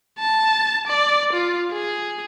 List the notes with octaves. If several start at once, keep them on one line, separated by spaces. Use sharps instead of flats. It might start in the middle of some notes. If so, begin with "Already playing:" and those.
A5
D5
F4
G#4